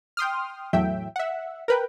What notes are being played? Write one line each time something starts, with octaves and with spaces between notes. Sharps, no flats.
G5 C6 D#6 F6
E2 A2 F#3 E5 G5
E5 F#5
A#4 B4 G5